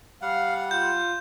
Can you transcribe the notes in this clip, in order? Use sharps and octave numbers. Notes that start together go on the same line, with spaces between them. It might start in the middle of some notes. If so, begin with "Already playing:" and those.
G3 F5 F#5
F4 G6